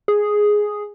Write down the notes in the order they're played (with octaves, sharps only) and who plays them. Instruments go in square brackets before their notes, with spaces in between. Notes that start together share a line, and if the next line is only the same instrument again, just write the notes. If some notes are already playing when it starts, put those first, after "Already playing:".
[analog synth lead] G#4